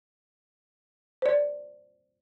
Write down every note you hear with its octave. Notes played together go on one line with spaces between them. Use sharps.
C5 D5